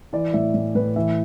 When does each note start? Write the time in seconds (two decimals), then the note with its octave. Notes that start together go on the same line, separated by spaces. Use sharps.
0.13 E3 D5
0.34 A2 E5
0.54 A2
0.75 A2 B4
0.96 E3 E5